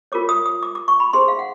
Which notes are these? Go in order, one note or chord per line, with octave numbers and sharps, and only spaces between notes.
F4 A#4 C#5 D6
D#6
D#6
D6
D6
C#6
B5
D#4 G#4 C5 C6
F5
F#5